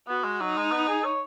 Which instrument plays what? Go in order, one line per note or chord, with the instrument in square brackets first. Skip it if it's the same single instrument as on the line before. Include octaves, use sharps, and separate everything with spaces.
[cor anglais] B3 [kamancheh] F#4
[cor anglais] G#3
[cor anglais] F#3 [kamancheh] D#4
[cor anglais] G#3
B3
G#4
C#5